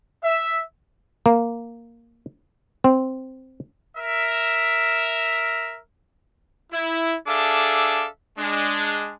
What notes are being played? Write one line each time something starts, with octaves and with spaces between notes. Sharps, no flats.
E5
A#3
C4
A#4 E5
E4
D4 G#4 A4 E5 F5 D6
G#3 D4